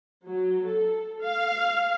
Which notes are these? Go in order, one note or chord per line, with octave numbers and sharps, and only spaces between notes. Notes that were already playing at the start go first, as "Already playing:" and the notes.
F#3
A4
F5